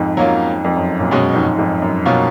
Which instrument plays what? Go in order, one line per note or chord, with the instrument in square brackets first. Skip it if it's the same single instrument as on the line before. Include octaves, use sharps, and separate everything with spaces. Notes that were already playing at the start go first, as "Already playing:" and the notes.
Already playing: [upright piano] F2 G#2
[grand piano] F#3 A#3 C#4 F4
[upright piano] F2
F#2
F#2 A#2
[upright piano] F#2 [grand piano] B2 G#3 C#4
[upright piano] F2 G#2
F2 G#2
F#2
[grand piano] B2 A#3 C#4 F4